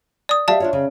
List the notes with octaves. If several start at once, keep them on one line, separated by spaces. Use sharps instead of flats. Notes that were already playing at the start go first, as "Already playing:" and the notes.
D5 D#6
G4 D5 E5 F5 A5
D4 F4 C#5
C#3